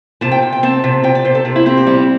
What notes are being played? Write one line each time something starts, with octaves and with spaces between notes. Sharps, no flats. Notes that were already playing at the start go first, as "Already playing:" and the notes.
C3 A5
G5
C3
G5
C4 A5
C3
C3 G5
D5
C3 C5
A4
C3 G4
E4
C4 G4
G4
G3 E4